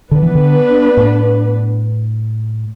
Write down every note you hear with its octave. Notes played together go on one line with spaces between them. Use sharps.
D3 B3 D4 B4
E3
D3
A2